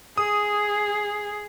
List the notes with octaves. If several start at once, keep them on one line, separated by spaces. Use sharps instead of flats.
G#4 D#6